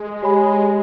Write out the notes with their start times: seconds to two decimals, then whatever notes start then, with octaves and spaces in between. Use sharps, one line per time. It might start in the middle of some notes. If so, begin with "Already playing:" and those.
Already playing: G#3
0.23 G4 C#5 G#5 B5